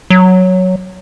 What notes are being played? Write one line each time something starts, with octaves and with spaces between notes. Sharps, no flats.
F#3